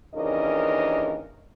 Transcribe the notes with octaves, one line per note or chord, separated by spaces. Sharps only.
D#2 C#3 E3 D4 A#4 D#5